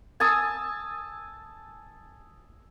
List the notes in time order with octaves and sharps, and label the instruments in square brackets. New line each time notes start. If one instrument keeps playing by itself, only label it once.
[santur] G#5 A5 D#6 E6